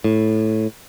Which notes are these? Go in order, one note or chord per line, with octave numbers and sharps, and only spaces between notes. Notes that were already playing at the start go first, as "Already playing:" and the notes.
A2